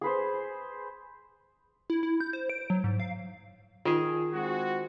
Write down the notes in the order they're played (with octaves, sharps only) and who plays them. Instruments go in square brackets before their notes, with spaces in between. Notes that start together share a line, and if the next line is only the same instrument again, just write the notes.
[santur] G#4 B4 C5
[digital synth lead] E4
E4
G6
C5
D7
F#3
G#2
F5
[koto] D#3 G#4 [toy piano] F4
[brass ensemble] G#3 C4 F#4